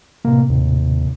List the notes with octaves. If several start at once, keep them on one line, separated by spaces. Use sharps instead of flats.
A2 C3 A#3
D#2